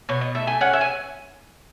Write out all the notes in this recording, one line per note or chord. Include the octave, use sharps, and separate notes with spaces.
B2 C#5
D#5
A3 E5
G#5
C#4 F#5
E5
G#5